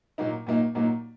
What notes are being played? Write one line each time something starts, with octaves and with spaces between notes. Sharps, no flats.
A#2 F#3 A#3 D#4
A#2 F#3 A#3 D#4
A#2 F#3 A#3 D#4